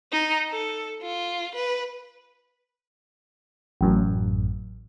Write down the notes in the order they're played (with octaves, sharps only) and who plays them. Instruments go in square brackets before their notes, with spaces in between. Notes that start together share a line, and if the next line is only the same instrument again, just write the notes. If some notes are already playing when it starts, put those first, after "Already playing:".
[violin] D#4
A4
F4
B4
[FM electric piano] A1 F#2